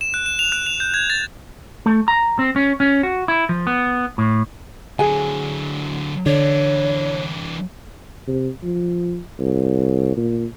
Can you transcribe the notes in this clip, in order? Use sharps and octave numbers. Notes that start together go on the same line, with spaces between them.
E7
F#6
E7
F7
F#6
F7
G6
G#6
A6
A3
A#5
C4
C#4
C#4
F#4
E4
F3
B3
A2
D3 F#3 G#4 G#5
D3 E3 D4 C#5
C3
F3
C2
A#2